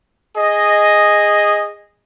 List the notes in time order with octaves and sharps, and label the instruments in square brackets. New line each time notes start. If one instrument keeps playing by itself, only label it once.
[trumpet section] G#4 D#5